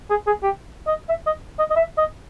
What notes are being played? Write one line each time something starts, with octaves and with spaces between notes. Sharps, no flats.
G#4
G#4
G4
D#5
E5
D#5
D#5
D#5
E5
D#5